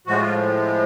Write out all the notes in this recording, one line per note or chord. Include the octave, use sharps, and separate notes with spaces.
A2 F3 G#3 F#4
F4